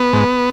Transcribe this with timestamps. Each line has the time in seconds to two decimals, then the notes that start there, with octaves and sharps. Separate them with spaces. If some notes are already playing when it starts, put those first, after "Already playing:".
Already playing: B3
0.13 G#2